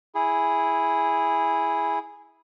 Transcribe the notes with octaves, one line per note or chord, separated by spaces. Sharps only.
E4 G#4